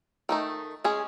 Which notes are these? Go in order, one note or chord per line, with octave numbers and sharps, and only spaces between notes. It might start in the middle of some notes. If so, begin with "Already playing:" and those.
D#3 A3 D#4
G#3 C#4 G#4